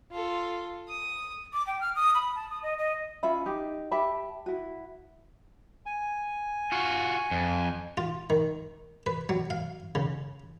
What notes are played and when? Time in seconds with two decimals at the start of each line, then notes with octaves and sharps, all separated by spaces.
0.11 F4 A4
0.88 D#6
1.53 D6
1.67 G5
1.81 F6
1.96 D#6
2.15 B5
2.35 A5
2.50 D#6
2.63 D#5
2.78 D#5
3.23 C#4 F4 E5 B5
3.46 D#4 G4
3.91 G4 E5 A5 B5
4.46 E4 F#4
5.86 G#5
6.72 F4 F#4
7.31 F2
7.97 F4
8.30 D#3
9.06 B4
9.29 F#3
9.50 F5
9.95 C#3